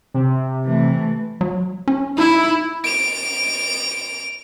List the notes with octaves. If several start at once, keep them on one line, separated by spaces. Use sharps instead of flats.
C3
E3 A3
F#3
C#4
D#4 E4
D7 F7